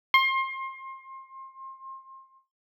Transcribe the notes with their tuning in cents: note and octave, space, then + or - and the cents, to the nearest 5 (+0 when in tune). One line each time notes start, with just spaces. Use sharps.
C6 +30